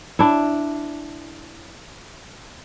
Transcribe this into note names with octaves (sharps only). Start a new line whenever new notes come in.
D4 E4